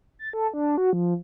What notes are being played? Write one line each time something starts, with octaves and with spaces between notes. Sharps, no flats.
A6
A4
D4
F#4
F3